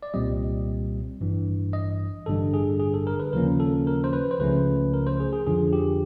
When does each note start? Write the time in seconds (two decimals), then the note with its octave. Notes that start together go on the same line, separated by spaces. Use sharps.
0.03 D5
0.14 C2 A#2 G3 C4 D#5
1.21 A1 G2 E3
1.73 D#5
2.26 A1 G2 D3 G3 A4
2.54 G#4
2.80 G#4
2.94 A4
3.07 A#4
3.20 B4
3.33 D#2 C#3 F3 A#3 C#4 A#4
3.60 A4
3.87 A#4
4.04 C5
4.13 B4
4.31 C5
4.39 C#2 C#3 F3 A3 C#4 B4
4.94 A#4
5.07 C5
5.20 G#4
5.33 G#4
5.46 F2 D3 F3 G#4
5.73 G4